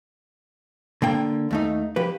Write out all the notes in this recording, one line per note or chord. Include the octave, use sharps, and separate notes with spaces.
D3 A#3 G5
D#2 A3 D#4
F3 G4 B4